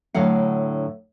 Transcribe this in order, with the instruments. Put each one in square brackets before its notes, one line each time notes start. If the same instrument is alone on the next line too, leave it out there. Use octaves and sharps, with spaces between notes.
[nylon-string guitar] A2 D3 F#3 F5 F#5